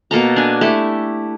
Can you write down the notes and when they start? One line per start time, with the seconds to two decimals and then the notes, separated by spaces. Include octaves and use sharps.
0.11 B2 A#3 A4 A#5
0.36 D4 G#5
0.61 A3 E4 G4